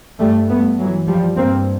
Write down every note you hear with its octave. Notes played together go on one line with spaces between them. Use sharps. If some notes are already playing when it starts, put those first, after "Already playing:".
G2 G3 A3
A3 B3
E3 F#3
F3 G3
G2 A#3 C4